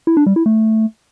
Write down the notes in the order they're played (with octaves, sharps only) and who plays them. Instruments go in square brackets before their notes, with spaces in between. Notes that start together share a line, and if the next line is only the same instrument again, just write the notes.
[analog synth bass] E4
D4
G3
E4
A3